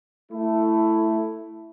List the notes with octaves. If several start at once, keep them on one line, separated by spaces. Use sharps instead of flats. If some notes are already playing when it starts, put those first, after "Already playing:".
A3 E4